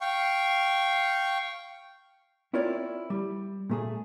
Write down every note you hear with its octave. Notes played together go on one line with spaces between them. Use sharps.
F5 G5 C#6
C4 E4 F4 A#4 C#5 D5
G3
A#2 A3 G#4